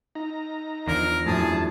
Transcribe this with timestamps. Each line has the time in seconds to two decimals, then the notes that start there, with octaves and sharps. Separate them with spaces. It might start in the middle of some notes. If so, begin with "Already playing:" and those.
0.15 D#4 A#5
0.88 E2 D3 F3 A#4
1.26 F#2 A2 G#4 A5